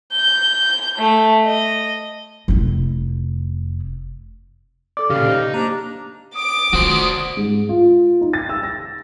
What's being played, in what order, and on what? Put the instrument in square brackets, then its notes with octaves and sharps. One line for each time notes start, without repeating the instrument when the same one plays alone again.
[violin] G6
A3
D#5
[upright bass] F1 E4
[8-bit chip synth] A4 D5 [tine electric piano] D6
[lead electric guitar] A#2 C#3 [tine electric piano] G4 [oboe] F5
[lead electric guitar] D#4 [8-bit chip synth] C5
[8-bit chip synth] A#3 G4 [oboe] D4 [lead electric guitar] A#5
[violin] D6 D7 [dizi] D#6
[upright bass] A3 F4 [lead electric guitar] F#4 C5
[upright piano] G#2
F4
D#4
A6
E6
A#6